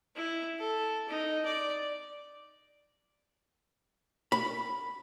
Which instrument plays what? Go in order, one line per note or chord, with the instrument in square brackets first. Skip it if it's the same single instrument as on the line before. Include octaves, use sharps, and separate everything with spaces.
[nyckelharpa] E4
A4
D#4
D5
[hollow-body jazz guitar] B5